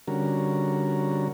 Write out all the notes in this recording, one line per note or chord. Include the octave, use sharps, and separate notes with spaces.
D3 G3 C#4 F#4 A#4